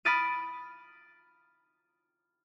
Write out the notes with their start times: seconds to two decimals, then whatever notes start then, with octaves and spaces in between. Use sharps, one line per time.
0.05 B5 D#6 F6 A6 D7 D#7